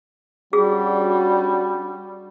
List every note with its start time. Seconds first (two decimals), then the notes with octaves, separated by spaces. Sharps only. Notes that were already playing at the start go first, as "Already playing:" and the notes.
0.53 G3 C#4 D4 F#4 G#4